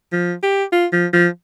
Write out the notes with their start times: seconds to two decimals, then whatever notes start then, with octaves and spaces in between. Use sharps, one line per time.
0.12 F3
0.43 G4
0.72 F4
0.93 F3
1.13 F3